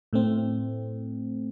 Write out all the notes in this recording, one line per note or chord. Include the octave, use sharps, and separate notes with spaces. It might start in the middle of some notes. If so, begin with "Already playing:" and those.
A2 A3 C4